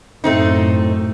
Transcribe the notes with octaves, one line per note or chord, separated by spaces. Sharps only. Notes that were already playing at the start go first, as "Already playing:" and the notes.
F#2 A2 A3 C4 D#4